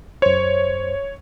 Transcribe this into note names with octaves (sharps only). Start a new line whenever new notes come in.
F#2 C5 C#5